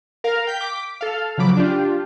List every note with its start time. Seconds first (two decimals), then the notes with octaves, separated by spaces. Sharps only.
0.24 A#4 F5
0.47 G5 G6 B6
0.61 D6 B6
1.01 A4 F5
1.38 C#3 F3 F#3 B5 D6
1.57 D4 F4 G4